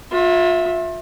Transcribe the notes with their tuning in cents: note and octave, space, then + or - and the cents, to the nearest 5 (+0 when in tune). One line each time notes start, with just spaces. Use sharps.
F4 +35 E5 +0